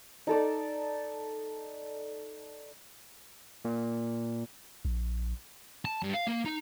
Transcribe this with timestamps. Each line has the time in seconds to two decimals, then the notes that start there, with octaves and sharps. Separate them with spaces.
0.27 D#4 A4 D5
3.65 A#2
4.85 A#1
5.85 A5
6.03 G2
6.14 F5
6.28 A#3
6.46 D#4